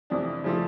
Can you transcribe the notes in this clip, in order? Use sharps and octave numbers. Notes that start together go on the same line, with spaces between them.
F2 C3 E3 D4
C#3 F3 A3